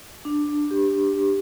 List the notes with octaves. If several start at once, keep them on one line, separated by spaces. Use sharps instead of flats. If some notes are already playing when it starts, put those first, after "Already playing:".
D4
G4
G4